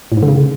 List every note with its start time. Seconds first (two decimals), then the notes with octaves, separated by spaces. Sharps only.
0.12 A2
0.17 G#2
0.23 D3
0.28 C#3